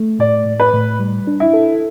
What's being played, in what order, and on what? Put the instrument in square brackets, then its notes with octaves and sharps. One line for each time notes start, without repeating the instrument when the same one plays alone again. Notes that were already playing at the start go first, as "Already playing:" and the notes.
Already playing: [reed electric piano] A3
[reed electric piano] A2 [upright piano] D5
[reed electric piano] A2
[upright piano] B4
[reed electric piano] A2
G3
D4
[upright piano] E4
[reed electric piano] A4